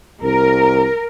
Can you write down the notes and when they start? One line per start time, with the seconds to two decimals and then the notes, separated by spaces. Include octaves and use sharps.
0.24 C2 A#4